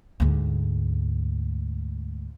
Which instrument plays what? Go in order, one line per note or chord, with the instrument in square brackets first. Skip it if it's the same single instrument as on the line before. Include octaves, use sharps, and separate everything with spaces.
[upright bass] D2 G#2